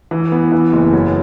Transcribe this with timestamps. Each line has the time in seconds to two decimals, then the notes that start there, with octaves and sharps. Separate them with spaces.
0.11 E3
0.32 B3
0.52 E3
0.73 F#1
0.93 F#3